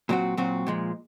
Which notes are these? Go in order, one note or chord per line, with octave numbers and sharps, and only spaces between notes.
A#2 F#3 C4 F#4
A#2 F#3 C4 F#4
A#2 F3 G#3